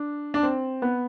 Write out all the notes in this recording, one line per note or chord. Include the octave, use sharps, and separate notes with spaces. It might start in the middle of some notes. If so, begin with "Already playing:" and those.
Already playing: D4
D4
C4
B3